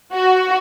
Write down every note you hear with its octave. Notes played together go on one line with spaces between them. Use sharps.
F#4